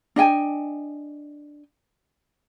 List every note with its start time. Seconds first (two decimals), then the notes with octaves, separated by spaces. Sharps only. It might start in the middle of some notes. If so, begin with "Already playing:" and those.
0.16 D4 D#5 G5 G#5